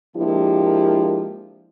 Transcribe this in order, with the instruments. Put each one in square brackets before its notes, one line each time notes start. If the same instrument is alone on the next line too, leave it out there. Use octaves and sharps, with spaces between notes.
[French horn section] F3 G#3 A#3 D4 E4 G4